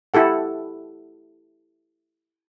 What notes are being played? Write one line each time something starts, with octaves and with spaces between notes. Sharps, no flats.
E4 G4 A4 F#5